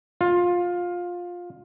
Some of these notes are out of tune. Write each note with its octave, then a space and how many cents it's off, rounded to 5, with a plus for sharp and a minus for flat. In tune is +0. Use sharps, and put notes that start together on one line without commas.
F4 +15